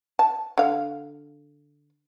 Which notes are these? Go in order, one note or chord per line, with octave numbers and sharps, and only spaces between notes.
A5
D3 F5